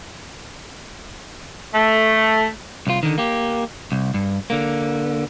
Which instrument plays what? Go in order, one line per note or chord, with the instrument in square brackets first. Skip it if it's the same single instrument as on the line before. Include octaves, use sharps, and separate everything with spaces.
[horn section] A3
[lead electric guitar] C2 F4
D3 D#3
A#3 G4
C2
G2
D3 A#3